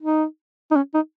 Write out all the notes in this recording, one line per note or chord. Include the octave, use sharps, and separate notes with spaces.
D#4
D#4
C#4
D#4